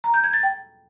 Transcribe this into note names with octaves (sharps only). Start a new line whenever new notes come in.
A#5
G6
G#6
A6
G5